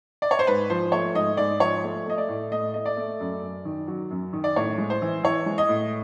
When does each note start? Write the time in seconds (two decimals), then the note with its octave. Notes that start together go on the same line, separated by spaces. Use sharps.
0.22 D5
0.31 C#5
0.39 C5
0.47 G#2 B4
0.70 F3 C5
0.92 A3 C#5
1.15 G#2 D#5
1.37 G#2 D5
1.60 F3 C#5
1.84 A3
2.06 A3 D#5
2.18 D5
2.29 A2
2.52 A3 D#5
2.74 A3 D#5
2.86 D5
2.97 A3
3.20 F#2
3.42 F#2
3.65 D#3
3.87 F#3
4.10 F#2
4.33 D#3
4.44 D5
4.56 A2 C#5
4.78 G#3
4.90 C5
5.02 E3
5.24 E3 C#5
5.46 G#3
5.58 D#5
5.69 A2